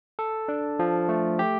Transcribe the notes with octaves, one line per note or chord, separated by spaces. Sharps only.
A4
D4
F3
A3
G4